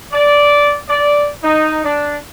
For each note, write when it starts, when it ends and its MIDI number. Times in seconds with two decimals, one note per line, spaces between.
0.12 0.76 74
0.89 1.27 74
1.42 1.81 63
1.84 2.15 62